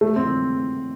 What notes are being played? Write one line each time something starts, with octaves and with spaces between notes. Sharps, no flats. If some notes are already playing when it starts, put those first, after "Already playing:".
A3
C4